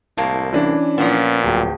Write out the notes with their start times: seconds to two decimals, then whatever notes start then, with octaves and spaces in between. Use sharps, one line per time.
0.18 C2 A2 A#3 A5
0.53 E3 C#4 D4
0.98 A#2 F3 B3
1.43 D1 F#3 G5